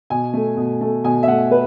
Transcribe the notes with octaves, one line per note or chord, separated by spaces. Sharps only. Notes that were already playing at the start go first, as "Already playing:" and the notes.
B2 G#5
A3
B2
A3
B2 G#5
E5
A3 F#5
B4